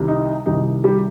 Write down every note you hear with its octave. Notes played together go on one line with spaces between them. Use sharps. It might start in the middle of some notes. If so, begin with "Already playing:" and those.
Already playing: C2 C3 D#3 G3
D#4
C2 C3 D#3 G3 D#4
G3 G4